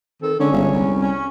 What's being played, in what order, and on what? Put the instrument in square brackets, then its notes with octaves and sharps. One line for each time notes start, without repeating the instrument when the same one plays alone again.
[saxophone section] D#3 C4 A4
[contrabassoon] D3 [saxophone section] G#3 C#4
[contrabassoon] G1
C2
[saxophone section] C#4